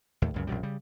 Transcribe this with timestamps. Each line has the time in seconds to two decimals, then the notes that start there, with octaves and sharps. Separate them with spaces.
0.22 D#2 A2
0.34 C#2 F#2 C#3
0.47 A#1 F#2 B2 G3
0.63 C#3 G3